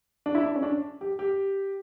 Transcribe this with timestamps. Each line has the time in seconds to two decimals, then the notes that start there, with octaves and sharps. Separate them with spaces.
0.26 D4
0.35 E4
0.44 D4
0.56 C#4
0.63 D4
1.01 G4
1.19 G4